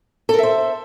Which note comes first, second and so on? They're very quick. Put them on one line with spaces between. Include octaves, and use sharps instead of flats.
A4 A#4 E5 C5